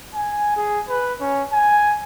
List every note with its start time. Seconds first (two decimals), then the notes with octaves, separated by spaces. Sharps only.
0.14 G#5
0.57 G#4
0.89 B4
1.21 C#4
1.52 G#5